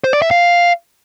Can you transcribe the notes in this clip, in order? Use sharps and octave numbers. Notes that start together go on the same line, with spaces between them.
C5
D5
E5
F5